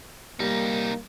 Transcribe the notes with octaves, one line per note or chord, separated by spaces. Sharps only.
C2 G3 A#3 D#4